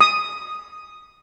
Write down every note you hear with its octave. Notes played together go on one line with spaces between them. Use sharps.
D#6